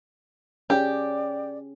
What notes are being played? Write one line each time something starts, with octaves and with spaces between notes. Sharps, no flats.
C#4 G4 G#4 D5